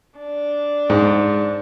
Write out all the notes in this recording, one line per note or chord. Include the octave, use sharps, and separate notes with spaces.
D4
G#2